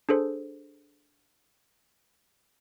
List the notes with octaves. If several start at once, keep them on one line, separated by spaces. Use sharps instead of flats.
D4 G#4 A4 C5